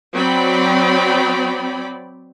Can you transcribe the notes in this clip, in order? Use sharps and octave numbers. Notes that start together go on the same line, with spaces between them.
F#3 C4 D5 G5 B5